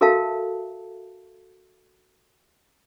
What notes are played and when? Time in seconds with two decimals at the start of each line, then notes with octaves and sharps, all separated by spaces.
0.01 F#4 A4 A#4 E5 F5 A5